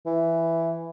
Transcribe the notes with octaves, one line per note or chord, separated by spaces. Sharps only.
E3